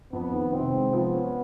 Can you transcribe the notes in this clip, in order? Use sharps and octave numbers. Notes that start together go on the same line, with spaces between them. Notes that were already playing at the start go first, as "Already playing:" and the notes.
F2 B3
D#3
C3 C4
G#3
F3 B3
C#4